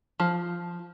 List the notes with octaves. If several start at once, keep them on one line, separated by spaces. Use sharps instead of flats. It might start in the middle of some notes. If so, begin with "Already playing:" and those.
F3